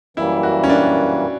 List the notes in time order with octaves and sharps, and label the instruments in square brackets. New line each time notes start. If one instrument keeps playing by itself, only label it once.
[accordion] F#2 E3 G3 A#3 [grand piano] E4
[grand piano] F#4
C#4
D4